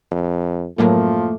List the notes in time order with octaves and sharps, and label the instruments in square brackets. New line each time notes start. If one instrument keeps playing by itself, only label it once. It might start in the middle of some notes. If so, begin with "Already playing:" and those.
[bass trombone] F2
[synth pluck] F#2 A2 F#3 [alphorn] F3 [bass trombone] A3 [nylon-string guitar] A#3